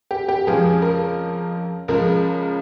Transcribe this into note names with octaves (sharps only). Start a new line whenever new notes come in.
G4
G4
F2 C#3 F3 G#3 G#4
A#4
C#2 C#3 F3 G#3 A#4